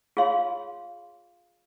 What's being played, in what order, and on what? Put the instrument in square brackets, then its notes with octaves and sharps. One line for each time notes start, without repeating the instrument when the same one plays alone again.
[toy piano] F4 G#4 C#5 F5 C6